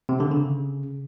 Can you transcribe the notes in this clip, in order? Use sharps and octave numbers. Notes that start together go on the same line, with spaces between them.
C3
D3
C#3